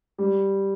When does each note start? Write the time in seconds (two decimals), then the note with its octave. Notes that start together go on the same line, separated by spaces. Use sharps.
0.18 G3